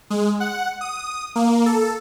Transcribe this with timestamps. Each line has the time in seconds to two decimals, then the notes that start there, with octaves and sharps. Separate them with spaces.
0.10 G#3
0.40 F#5
0.81 D#6
1.35 A#3
1.66 A4